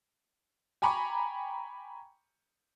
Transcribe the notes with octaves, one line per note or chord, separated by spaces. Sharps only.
G5 G#5 A#5 B5 C#6 D6